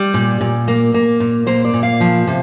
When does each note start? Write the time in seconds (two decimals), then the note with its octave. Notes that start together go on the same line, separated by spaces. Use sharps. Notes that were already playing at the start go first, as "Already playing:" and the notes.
Already playing: G3 D5
0.14 A#2
0.41 A#2
0.68 A#3
0.94 A#3
1.20 A#2
1.47 A#3 C5
1.65 D5
1.74 A#2
1.83 F5
2.00 F3
2.27 C3